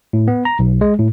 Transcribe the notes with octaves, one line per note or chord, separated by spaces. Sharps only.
A2
B3
A#5
B1
G#3
A2